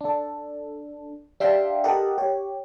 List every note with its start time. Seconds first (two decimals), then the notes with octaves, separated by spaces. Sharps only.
0.01 D4 A4
1.40 D4 G4 E5 F5 G5 C6
1.84 G4 A4 A#4 D#5 F#5 A5
2.18 G4 C#5